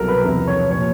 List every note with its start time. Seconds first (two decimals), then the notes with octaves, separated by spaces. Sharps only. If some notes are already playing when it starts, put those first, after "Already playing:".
Already playing: C2 B2 F#3 A4 A#4
0.08 B4
0.24 E2 C3 F3
0.47 C#5
0.71 A#2 F3 C#5